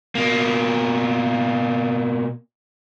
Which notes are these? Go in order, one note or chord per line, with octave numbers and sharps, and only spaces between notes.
B2 A#3